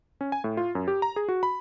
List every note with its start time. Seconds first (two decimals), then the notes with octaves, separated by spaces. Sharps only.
0.21 C#4
0.32 G#5
0.44 A2
0.57 F4
0.75 F#2
0.88 G4
1.02 A#5
1.16 G#4
1.28 F#4
1.43 B5